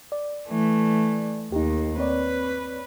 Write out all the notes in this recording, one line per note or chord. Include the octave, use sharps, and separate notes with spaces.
D5
E3 A3
D#2 D#4 G4
C4 B4 C#5 D5